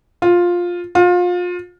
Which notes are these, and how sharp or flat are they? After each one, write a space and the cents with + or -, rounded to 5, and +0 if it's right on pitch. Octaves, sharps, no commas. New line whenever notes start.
F4 +10
F4 +30